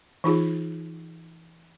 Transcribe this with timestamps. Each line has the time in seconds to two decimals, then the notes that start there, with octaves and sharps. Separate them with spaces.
0.24 E3 D#4 F4 G#4